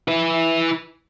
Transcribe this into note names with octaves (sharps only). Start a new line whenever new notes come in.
E4 B4